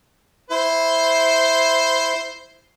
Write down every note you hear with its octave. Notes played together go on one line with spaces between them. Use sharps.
E4 C5